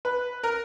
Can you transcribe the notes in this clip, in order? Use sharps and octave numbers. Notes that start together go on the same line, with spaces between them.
B4
A#4